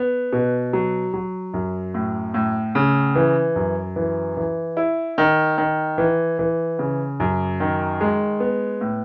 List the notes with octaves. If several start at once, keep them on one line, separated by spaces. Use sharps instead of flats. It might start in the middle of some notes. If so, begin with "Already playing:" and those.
Already playing: B3
B2
F#3
F#3
F#2
A2
A2
C#3
E3
F#2
E3
E3
E4
D#3
D#3
E3
E3
C#3
F#2
D#3
G#3
B3
A2